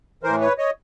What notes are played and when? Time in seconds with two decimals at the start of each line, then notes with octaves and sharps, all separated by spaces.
0.23 A2 E3 A#4 C5
0.41 B4 C#5
0.58 C#5 D#5